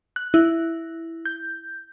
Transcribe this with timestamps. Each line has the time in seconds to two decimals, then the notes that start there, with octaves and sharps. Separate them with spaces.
0.16 F#6
0.34 E4
1.26 G6